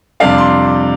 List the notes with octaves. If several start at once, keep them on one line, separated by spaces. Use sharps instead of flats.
F2 C3 G3 D4 F5 A5
C6